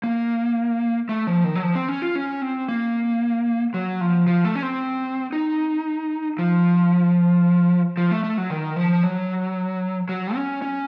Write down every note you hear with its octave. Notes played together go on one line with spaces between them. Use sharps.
A#3
A3
F3
D#3
F#3
F3
C4
C#4
F4
C#4
C4
A#3
F#3
F3
F3
A3
C#4
C4
D#4
F3
F3
A3
A3
F#3
D#3
F3
F#3
F#3
C#4
C#4